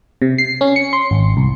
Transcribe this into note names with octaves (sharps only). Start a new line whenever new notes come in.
C3
C7
C#4
C#7
C6
G#1
C2